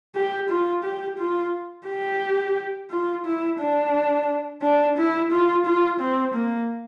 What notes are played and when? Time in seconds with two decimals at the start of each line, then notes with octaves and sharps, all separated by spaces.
0.16 G4
0.49 F4
0.84 G4
1.19 F4
1.87 G4
2.91 F4
3.25 E4
3.60 D4
4.62 D4
4.98 E4
5.32 F4
5.65 F4
6.00 C4
6.34 A#3